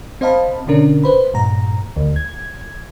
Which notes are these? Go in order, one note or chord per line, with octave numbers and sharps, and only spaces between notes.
C4 C5 D#5 F5 A5 B5
B2 D3 C#4 D4 A#4
B4 C5 B5
G2 A#2 A#5
D2
G#6